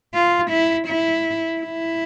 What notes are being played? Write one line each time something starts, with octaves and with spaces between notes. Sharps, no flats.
F4
E4
E4
E4